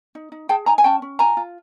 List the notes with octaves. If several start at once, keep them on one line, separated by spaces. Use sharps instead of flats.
D#4
D#4
G#4 G5 A5
D#4 G#5 A#5
G#5
C#4 G5 A5
C#4
F4 G#5 A#5
F4